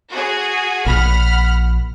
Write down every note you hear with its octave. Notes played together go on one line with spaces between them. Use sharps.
F#4 G#4
A#1 A#2 F#5 B5 F6